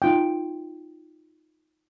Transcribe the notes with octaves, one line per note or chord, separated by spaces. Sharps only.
D#4 F4 G5